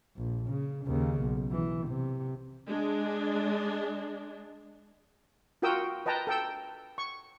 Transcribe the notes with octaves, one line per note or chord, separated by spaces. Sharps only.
A#1
C#3
D#2 C#3
B1
E3
C3
G#3 D4
F4 F#4 A#4 G5 D#6 E6
B4 D#5 G5 A5 A#5
A4 G5 E6
C#6